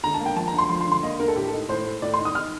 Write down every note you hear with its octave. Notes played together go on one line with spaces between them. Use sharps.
D3 A#5
A5
A#3
G5
F3 A5
A#5
D2 C6
F3 C6
C6
D3
C6
A#3 D#5
D2 A#4
A4
A2 G4
A4
D#4
A2 C5
A3
A2 D5
C6
D#4
D#6
D#4 F6